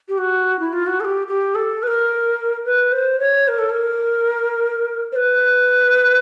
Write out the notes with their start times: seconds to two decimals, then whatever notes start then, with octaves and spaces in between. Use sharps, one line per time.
0.08 G4
0.18 F#4
0.59 E4
0.73 F4
0.86 F#4
1.00 A4
1.04 G4
1.27 G4
1.55 A4
1.83 B4
1.87 A#4
2.65 B4
2.92 C5
3.20 C#5
3.48 A#4
3.58 A4
3.69 A#4
5.12 C5
5.16 B4